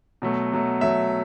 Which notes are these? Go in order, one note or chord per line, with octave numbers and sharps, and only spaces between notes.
B2 F#3 A3
B2 F#3 A3
B2 F#3 A3 E5